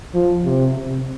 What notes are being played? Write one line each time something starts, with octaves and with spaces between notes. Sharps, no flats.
F3
C3
C3